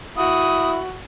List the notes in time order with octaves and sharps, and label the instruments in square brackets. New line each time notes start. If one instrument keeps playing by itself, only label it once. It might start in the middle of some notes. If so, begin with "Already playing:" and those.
[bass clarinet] E4 [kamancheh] F#4 [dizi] D#6